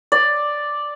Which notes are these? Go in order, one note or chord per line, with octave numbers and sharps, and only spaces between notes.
D5